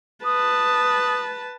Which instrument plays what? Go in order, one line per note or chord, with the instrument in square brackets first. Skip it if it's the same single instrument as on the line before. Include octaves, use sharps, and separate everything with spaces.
[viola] B4 A5 [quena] D#6